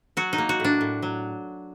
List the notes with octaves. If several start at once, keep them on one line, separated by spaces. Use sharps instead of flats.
F#3 F#4
D#4
A#3
F#4
A2 D4
A2
F#3